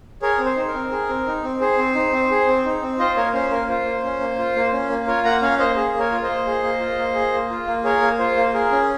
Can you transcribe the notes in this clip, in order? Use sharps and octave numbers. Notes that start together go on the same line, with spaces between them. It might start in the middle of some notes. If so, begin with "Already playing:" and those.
G#4 A#4 C#5
C4
C5
D#4
A#4
C4
G#4
C4
D#4
C4
G#4 C5
C4
D#4
C4
G#4
C4
D#4
C4
F4 C5 D#5
A#3 A#4 C#5
C#4 C5
A#3 A#4
F4 C5
A#3
C#4
A#3
F4
A#3
C#4
A#3
F4 A#4 C#5
A#3 F#5 A#5
C#4 C#5 F5
A#3 C5 D#5
G#4
A#3
A#4 C#5
F4
C5 D#5
A#3
G#4
A#3
F4
A#3
G#4
A#3
F4
A#3
G#4 A#4 C#5
A#3
F4 C5
A#3
G#4 A#4
C#4